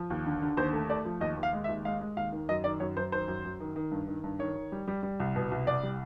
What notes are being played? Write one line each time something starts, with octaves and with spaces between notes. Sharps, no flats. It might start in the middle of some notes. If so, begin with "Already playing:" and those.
Already playing: F3
D#2
D3
D3
D#2 C5
A3
A3 D5
F3
D#2 D#5
D#2
F5
G#3
E5
D#2
G#3 F5
G#3
D#2 F5
D#3
F#2 D#5
D#3 D5
F#2 C#5
F#2 C5
D#3 C5
F#2
F#2
D#3
D#3
G2
D#3
G2
D#3 C#5
D#3
G3
G3
G3
C2
B2
C2
C2 D5
G3